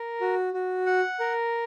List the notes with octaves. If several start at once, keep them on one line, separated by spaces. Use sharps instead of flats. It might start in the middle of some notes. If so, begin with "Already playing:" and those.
Already playing: A#4
F#4
F#4
F#5
A#4